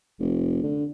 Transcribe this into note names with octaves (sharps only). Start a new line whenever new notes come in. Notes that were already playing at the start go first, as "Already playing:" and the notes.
F1
D3